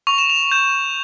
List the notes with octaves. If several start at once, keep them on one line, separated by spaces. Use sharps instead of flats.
C#6 F7
E7
F7
G6 E7